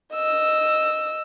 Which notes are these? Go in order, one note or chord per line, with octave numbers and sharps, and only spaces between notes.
D#5 E6